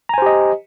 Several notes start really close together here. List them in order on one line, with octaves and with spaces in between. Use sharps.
A#5 G#5 C5 G4 D#5